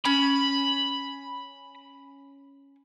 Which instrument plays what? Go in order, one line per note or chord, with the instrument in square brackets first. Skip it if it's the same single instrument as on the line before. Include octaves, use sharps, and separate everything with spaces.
[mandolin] C#4 [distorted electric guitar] B5